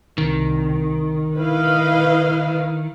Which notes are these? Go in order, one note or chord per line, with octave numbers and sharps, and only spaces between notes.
C2 D#3
E4 B4 D#5 F5